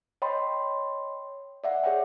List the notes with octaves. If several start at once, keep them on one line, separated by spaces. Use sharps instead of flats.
C#5 D#5 G5 B5 C6
D5 E5 F#5
G#4 C#5 E5 F#5 G5